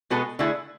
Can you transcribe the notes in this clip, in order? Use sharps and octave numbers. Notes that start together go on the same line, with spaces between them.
B2 G#3 B3 F#4 A4
D3 A3 E4 G#4